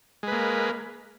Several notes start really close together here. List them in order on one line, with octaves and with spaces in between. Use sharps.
G#3 B4 A#3